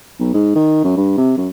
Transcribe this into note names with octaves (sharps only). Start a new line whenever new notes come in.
B1
G#2
D#3
F#2
G2
C3
F#2